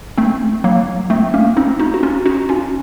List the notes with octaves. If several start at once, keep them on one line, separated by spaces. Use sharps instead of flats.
A3 C4
F#3 A#3
A3 C4
A#3 C#4
C4 D#4
D#4 F#4
F#4
C#4 F4
D#4 F#4
C#4 F4